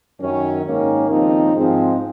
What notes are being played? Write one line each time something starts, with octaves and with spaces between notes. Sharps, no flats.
F#2 D#3 F#3 C#4
G#2 D#3 A#3 C#4
D#2 C#3 F3 C4 D#4
G#2 F3 G#3 C4